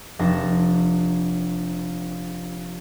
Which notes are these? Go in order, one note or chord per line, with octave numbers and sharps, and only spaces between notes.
F1 D4 A5 A#6 E7